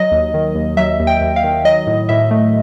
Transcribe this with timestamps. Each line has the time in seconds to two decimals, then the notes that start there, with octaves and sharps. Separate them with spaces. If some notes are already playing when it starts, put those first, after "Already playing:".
Already playing: F#3 D#5
0.12 D#2
0.34 D#3
0.55 D#2
0.77 F#3 E5
1.00 D#2
1.07 G5
1.21 D#2
1.36 F5
1.44 D#3
1.65 F#3 D#5
1.87 A2
2.09 A2 E5
2.31 A3